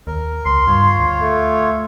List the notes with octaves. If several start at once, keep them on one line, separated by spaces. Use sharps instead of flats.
D#2 A#4
C#2 C6
G2 F4 C#5
D2
A3